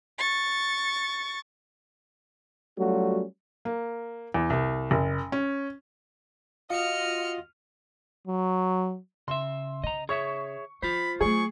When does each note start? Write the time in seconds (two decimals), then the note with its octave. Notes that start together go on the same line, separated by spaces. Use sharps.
0.19 C#6 A6
2.78 F#3 G3 A3 C#4 F4 F#4
3.65 A#3
4.34 E2
4.50 C2
4.91 F#1
5.32 C#4
6.70 F4 F#4 D#5 F5 F6 C#7
8.27 F#3
9.28 C#3 E5 C6
9.84 C#3 D#5 A#5
10.09 G#4 C#5 E5 C#6
10.82 F3 F4 C5 B5
11.21 F#3 A3 G#4 C#6